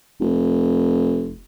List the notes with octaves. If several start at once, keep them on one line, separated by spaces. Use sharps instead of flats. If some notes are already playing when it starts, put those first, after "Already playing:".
F1